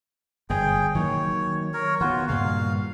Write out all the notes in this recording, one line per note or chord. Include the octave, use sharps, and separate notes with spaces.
G1 F#2 G#4 G5
D#3 F#3 A#3 C#5
A#4 C#5
D#3 B3 F4 F#4
G2 A#2 C#3 F5